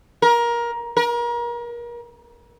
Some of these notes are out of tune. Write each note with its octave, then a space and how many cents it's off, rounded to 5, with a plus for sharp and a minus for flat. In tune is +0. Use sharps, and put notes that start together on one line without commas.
A#4 +20
A#4 +35